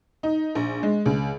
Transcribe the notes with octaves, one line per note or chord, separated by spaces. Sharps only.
D#4
A#1
G#3
C#2